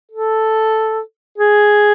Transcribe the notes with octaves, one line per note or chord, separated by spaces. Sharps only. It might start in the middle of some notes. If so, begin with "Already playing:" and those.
A4
G#4